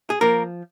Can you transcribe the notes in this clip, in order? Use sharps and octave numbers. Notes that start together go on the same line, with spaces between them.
G#4
F3 A#3 A#4